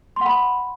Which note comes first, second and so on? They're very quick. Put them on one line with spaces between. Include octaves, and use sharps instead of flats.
C6 F#5 B5